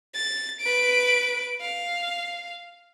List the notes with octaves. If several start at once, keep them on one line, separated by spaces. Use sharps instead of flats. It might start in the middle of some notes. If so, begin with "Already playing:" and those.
A6
B4 D7
F5